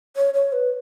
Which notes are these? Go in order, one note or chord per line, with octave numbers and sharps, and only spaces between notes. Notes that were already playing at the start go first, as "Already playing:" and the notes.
C#5
C#5
B4